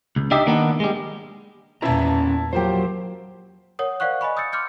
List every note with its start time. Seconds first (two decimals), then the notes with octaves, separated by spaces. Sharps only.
0.16 C#2
0.31 D4 D#4 G4 E5
0.47 D#3 A#3 B3 D4
0.80 G3 G#3
1.82 E2 A#2 C#4 E4 B4 A5 A#5
2.53 F3 F#3 A#3 G4 C5
3.79 A#4 C#5 F#5 D#6
4.00 C5 D5 F5 F#5 C#6 F#6
4.21 D#5 G#5 B5 C#6
4.37 D#6 E6 G6 A6 C#7
4.53 C6 D6 F6 G6 C#7